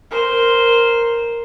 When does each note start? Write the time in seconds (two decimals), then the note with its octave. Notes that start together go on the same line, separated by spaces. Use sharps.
0.11 A#4 C5